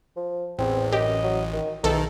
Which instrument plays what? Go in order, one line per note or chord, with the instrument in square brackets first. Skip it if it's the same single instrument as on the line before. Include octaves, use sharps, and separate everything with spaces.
[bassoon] F3
[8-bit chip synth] A1 [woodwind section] E2 [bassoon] C4
[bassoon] F#2 [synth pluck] G4 [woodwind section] D#5
[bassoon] F#3
D#3
[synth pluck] B1 A4 [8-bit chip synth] D#3 [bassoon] E3 [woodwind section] G#3 D#4